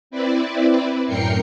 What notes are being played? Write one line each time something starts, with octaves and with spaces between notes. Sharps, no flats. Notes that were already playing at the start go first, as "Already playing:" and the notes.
C4 E4 B4 D5
F#2 A2 A#4 G5 C7 C#7